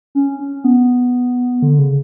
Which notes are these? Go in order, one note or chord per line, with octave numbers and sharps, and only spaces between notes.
C#4
C#4
B3
D3
C#3